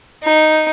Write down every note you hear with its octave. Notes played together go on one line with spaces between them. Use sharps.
D#4